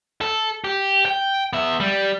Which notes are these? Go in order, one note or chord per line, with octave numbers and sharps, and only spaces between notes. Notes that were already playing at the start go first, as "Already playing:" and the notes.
A4
G4
G5
B3 E5
G3